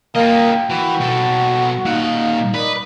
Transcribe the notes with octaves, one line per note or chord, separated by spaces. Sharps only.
A#3 F4 D#5 G5
E3 F#4
B2 A4
A#2 D#4 F5 F#5
A#4 B4 D5 D#5